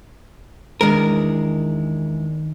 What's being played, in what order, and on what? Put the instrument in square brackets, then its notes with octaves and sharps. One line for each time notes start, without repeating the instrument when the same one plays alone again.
[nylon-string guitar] E2 G#3 D4 [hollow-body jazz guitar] D#3 A#4